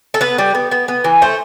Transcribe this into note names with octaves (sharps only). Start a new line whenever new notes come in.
A4
B3 B4
G3
B3
B3
B3
E3
A3 C5